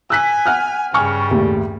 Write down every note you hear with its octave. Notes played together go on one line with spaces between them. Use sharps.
G#5 E6 F#6 B6
F#5 F6 F#6
G2 C#3 G3 G#5 C#6 F6
D#2 A2